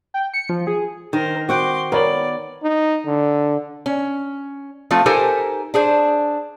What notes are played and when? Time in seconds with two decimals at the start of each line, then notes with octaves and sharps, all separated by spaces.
0.14 G5
0.34 C#7
0.49 F3
0.67 G#4
1.13 D#3 A#4 C5
1.49 C4 F#4 F#5 G5 C6 D6
1.92 B3 A#4 C#5 D5 F#7
2.63 D#4
3.06 D3
3.86 C#4
4.91 F3 A3 C4 F4
5.06 D#4 G4 A4 A#4 C5 G#5
5.74 D4 G#4 C5